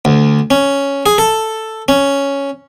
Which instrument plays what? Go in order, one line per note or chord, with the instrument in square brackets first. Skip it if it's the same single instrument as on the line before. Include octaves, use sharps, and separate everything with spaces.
[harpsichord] D2
C#4
G#4
A4
C#4